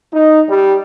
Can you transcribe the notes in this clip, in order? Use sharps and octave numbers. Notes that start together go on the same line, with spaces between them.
D#4
G3